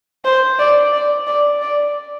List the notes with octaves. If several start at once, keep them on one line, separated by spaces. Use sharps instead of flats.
C5
D5
D5
D5
D5